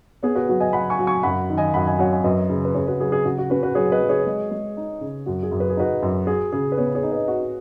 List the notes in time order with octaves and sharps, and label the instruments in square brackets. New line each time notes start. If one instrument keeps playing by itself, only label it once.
[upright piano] B3 [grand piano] G#4 C#5
[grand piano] F#4 B4
[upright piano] F#3 [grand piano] F#4
[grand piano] D#5 G#5
[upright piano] F#3 [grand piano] F#5 B5
[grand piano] G#5 C#6
[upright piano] F#3
[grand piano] G#5 C#6
[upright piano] F#2 [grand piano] F#5 B5
[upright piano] D#3
[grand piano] D#5 G#5
[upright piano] F#2 [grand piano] F#5 B5
[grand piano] D#5 G#5
[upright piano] F#3 [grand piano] C#5 F#5
[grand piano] D#5 G#5
[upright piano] F#2 [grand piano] B4 D#5
[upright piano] C#3
[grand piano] B4
[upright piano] C#3 [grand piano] G#4 C#5
[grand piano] F#4 B4
[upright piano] F#3 [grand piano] G#4
[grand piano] G#4
[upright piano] C#3 [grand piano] F#4
[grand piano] F#4
[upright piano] C#4 [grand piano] F#4 B4
[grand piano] F#4 B4
[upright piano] F#3 [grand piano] G#4 C#5
[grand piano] B4 D#5
[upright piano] F#3
[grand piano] G#4 C#5
[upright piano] G#3
G#3
D#4
C#3
[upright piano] F#2 [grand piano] F#4
[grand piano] G#4
[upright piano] F#2
[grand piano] B4
G#4
[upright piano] D#4 [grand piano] F#4 B4
[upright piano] F#2
[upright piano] F#4 [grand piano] G#4
[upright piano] C#3 [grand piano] G#4
[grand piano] B4
[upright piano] B3 [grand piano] G#4 C#5
[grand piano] G#4 C#5
[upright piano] D#4
[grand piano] B4 D#5
[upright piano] F#4